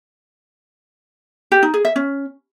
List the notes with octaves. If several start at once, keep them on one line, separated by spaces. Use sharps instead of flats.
G4
D#4
G#4
E5
C#4